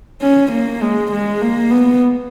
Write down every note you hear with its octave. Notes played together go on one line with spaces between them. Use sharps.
C#4
A#3
G#3
G#3
A#3
B3